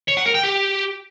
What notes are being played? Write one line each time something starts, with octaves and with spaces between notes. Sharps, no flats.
C#5
F#5
A#4
G5
G4